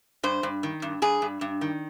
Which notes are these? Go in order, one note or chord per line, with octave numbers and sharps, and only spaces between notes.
G2 C5
G2
D#3
G2
G2 G#4
G2
G2
D#3